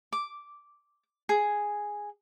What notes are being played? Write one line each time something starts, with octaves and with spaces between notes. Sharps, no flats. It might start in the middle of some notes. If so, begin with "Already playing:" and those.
D6
G#4